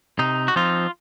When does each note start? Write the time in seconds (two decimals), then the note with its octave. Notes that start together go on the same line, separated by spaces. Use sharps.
0.19 C3 D#4
0.48 F#4
0.56 F3 C4 D#4 F4